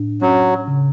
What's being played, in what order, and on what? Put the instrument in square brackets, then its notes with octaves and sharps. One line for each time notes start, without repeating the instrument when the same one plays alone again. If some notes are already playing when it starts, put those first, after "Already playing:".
Already playing: [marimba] A2 D4
[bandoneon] F#3 [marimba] C#4
[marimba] C#3